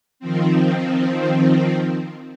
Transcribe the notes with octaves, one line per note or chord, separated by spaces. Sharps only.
D#3 F3 C4